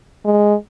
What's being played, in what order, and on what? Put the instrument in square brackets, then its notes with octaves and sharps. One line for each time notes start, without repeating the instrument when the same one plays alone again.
[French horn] G#3